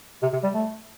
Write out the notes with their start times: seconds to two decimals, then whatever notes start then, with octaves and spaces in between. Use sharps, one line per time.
0.23 C3
0.33 C3
0.43 G3
0.54 A3